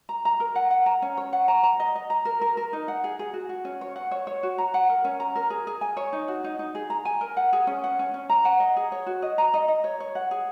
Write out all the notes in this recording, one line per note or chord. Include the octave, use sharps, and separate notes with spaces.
A#5
A#5
A#4
F#5
F#5
A#5
C#4
C#5
F#5
A#5
A#5
D#5
D#5
A#5
A#4
A#4
A#4
D#4
F#5
G#4
G#4
F#4
F#4
C#4
C#5
F#5
C#5
C#5
F#4
A#5
F#5
A#4
C#4
A#5
A#4
G#4
G#4
G#5
C#5
D#4
F#4
D#4
D#4
G#4
A#5
G#5
A#4
F#5
G#4
C#4
F#5
C#4
C#4
A#5
F#5
D#5
G#4
C#5
F#4
D#5
A#5
D#5
D#5
C#5
C#5
F#5
G#4